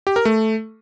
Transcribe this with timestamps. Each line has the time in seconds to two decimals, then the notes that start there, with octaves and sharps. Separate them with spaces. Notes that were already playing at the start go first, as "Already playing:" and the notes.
0.07 G4
0.16 A#4
0.25 A3